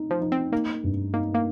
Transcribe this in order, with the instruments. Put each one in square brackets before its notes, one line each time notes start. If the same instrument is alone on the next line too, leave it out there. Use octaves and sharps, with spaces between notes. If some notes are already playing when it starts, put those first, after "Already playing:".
Already playing: [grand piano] D#4
[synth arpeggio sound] F3
[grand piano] D#4
[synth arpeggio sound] C4
[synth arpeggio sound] A#3 [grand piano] D#4
[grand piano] G2
[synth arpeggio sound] A#3 [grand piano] D#4
[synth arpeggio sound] A#3